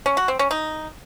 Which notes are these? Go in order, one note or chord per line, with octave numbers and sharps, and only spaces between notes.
C#4
F#4
C4
C#4
D#4